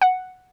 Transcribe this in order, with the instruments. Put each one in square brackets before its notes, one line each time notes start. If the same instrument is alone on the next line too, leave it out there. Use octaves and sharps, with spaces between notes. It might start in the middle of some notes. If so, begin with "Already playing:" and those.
[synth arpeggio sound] F#5